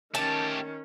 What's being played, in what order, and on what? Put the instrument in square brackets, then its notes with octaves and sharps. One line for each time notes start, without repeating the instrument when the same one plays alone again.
[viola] D#3 C#4 [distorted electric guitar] A3 G4 [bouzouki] A5